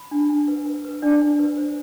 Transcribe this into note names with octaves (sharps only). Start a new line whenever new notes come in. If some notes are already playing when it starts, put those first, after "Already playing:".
Already playing: B5
D4
D4
B4
B4
B4
D4 D5
D4
B4
C5